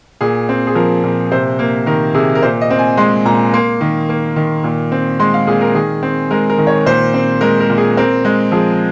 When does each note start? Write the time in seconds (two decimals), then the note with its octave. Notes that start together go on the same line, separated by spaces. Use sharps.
0.21 A#2 G#4
0.49 C4
0.67 G#4
0.75 F3 A#4
1.03 A#2
1.32 C3 C5
1.59 A#3
1.86 D#3 A#4
2.14 C3 G#4
2.35 A#4
2.42 A#2 C5
2.61 D#5
2.71 C4
2.79 G#5
2.97 G#3 C6
3.25 A#2 A#5
3.54 A#3 C6
3.81 D#3
4.09 A#3
4.36 D#3
4.64 A#2
4.92 C4
5.19 G#3 C6
5.34 F5
5.47 A#2 G#4
5.61 A#4
5.74 D#3 G#4
6.03 C4
6.31 G#3 A#4
6.50 A#4
6.58 D#3
6.67 C#5
6.86 A#2 C5
7.14 C4
7.41 G#3 A#4
7.60 A#4
7.70 A#2
7.78 G#4
7.97 C4 A#4
8.25 G#3
8.52 F3 G#4